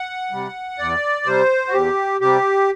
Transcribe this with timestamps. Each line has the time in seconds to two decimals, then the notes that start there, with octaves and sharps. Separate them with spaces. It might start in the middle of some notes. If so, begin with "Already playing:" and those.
Already playing: F#5
0.31 C3 G3
0.78 E2 D5
1.25 C3 G3 C5
1.67 F#4
1.73 E2 G4
2.21 C3 G3 G4